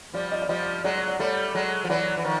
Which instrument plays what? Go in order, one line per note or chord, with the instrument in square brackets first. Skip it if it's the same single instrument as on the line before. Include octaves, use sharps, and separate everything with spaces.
[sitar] F3 G3 [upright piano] D5
[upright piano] D#5
D5
[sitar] F3 G3 [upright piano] D#5
[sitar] F#3 G#3 [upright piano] D5
[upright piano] D5
D5
[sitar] G3 A3 [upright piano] C#5
[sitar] F#3 G#3
F3
[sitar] E3 F#3 [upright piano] D5
[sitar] E3
D#3 F3